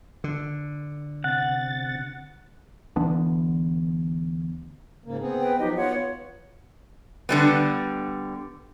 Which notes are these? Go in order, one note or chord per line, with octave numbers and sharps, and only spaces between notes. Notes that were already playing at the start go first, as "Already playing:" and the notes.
D3
C3 F#5 A6
D2 E3 B3 D4
G#2 C#3 A#3
B3 C4 G#4
B4 G5
F3 F#3 D#4 G4 D#5
B3 F4 C#5 F#5
D3 G3 B3